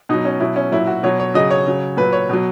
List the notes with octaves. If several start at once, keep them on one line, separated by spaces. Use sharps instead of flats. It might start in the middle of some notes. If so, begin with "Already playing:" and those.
B2 F#3 D#4
C#4
B2 F#3 E4
C#4
A#2 F#3 E4
F#4
B2 F#3 C#5
C#5
C#3 F#3 D#5
C#5
C#3 F#3
A#2 F#3 B4
C#5
B2 F#3